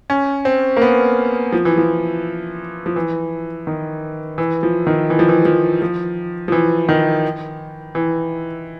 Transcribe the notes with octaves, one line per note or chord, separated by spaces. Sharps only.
C#4
C4
A#3
B3
F3
E3
F3
F3
E3
D#3
E3
F3
D#3
E3
F3
E3
F3
F3
F3
E3
D#3
E3